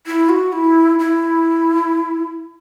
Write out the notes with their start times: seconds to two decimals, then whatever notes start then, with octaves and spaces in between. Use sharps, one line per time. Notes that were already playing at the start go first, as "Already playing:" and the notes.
0.07 E4
0.29 F#4
0.52 E4
0.99 E4